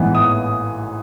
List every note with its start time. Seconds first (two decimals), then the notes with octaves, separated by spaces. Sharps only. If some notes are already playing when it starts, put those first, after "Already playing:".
Already playing: A1 G#2 E3 B3 B5
0.15 D#6